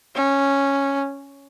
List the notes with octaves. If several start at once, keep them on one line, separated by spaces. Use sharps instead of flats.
C#4